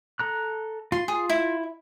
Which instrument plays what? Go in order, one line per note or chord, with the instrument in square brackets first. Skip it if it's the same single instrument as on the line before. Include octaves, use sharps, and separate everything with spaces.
[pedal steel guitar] A4 A#5 F#6
[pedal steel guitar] F4 [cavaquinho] C6
[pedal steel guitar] F4 [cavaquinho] G#4
[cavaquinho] E4